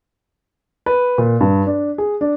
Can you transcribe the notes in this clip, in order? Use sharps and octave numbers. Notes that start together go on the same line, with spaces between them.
B4
A#2
G2
D4
G#4
D4